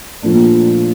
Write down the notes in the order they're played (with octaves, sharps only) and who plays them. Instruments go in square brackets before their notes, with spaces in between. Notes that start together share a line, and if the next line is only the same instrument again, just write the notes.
[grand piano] A#2 F3 A3 D4